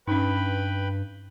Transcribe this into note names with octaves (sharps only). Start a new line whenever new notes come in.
G2 C#4 D#4 B4 G5 B5